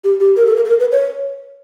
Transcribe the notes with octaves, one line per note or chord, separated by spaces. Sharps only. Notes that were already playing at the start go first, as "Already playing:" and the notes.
G4
G4
A#4
A4
A#4
A4
A#4
B4
C#5